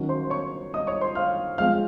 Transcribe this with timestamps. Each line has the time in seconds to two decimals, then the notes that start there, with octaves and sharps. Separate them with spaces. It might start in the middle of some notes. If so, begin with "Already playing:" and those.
Already playing: D#3 F#3 C#4
0.09 C5 C6
0.30 C#5 C#6
0.74 D#5 D#6
0.87 C#5 C#6
1.01 C5 C6
1.15 F5 F6
1.58 F3 G#3 C4 F5 F6